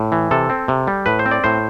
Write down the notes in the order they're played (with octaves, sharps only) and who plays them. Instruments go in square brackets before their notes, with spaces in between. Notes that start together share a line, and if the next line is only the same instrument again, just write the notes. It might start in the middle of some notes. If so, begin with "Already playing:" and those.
Already playing: [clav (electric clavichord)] A2
E3
C3 A4
C4
C3
G3
A2 B4
C5
C4
D5
A2 C5